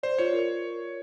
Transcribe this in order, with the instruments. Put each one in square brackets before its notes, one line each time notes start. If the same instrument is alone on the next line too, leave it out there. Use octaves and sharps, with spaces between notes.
[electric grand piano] C5 [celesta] D5
[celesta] F4 [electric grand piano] C#5
[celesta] A#4